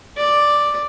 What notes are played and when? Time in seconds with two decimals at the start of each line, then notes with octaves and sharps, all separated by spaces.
0.17 D5